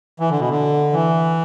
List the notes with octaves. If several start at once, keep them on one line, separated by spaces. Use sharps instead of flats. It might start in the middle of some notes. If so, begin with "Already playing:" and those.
E3
D3
B2
D3
E3